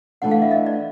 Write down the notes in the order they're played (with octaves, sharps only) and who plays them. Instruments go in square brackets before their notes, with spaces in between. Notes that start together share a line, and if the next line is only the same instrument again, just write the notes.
[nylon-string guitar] E3 A3 D4 [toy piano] F#5
[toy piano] F5
E5
D#5
D5